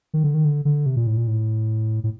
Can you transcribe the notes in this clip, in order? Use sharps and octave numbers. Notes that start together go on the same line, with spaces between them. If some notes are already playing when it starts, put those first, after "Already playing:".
D#3
D3
D#3
D3
D3
C3
A#2
A2
A#2
A2
A2